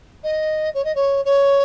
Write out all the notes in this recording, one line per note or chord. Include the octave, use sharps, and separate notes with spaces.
D#5
C#5
D#5
C#5
C#5